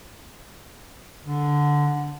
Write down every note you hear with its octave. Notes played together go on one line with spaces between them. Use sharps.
D3